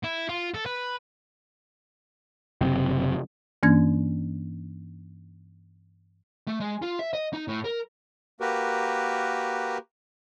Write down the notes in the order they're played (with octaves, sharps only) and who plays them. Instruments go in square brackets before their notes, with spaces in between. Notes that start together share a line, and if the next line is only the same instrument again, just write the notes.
[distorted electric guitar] E4
F4
A4
B4
[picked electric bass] F#1 C3 C4
[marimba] G2 E3 A#3 C#4 D4 G#6
[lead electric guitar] A3
G#3
F4
E5
D#5
D#4
A2
A#4
[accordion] A#3 F#4 G4 A#4 B4